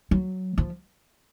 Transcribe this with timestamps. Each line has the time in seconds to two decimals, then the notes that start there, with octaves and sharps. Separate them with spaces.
0.11 F#3
0.58 F3